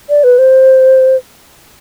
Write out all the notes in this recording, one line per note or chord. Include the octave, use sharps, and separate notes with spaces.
D5
B4
C5